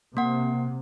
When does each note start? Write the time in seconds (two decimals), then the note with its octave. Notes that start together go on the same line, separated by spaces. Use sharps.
0.17 C3 A#3 F#5